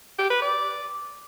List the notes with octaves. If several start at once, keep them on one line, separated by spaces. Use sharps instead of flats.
G4
B4
D5